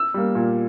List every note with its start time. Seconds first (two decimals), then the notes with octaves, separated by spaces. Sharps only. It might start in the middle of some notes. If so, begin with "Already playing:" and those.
Already playing: E6
0.14 G3 A#3
0.35 A#2